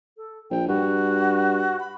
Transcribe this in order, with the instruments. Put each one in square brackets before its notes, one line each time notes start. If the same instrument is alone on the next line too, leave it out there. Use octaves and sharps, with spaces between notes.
[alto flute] A4
[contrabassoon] A#1 [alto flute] G5
[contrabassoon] G2 [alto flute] F#4
[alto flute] B5